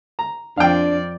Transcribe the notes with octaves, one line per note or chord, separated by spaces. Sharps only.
A#5
F2 D4 D5 F5 G5